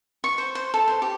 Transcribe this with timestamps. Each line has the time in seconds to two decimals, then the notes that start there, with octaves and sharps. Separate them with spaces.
0.24 C#6
0.38 C5
0.55 C5
0.74 A4
0.88 C5
1.02 G4